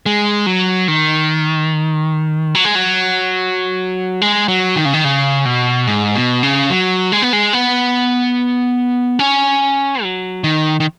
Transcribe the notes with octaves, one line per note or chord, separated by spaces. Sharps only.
G#3
F#3
D#3
F#3
G#3
F#3
G#3
F#3
D#3
C#3
D#3
C#3
B2
G#2
B2
C#3
F#3
G#3
B3
G#3
B3
C#4
F#3
D#3
D#3